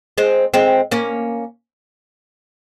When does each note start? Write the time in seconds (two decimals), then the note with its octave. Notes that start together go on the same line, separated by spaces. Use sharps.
0.18 G#3 C4
0.54 G#3 C4
0.91 A#3 C#4